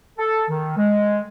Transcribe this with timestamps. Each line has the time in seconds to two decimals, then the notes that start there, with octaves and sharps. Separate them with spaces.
0.18 A4
0.49 D#3
0.77 G#3